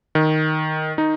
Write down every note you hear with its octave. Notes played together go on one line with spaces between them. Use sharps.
D#3
D#4